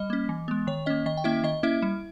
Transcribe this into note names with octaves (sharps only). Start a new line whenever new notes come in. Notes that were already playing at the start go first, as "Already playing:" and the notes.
Already playing: G3 D#5
A#3 C#4
E3
G#3 B3
D#3 C#5
A#3 C#4 D#5
D#3 D#5
G5
A#3 C#4 E4 E5
D#3 D#5
A#3 C#4 E4 E5
G3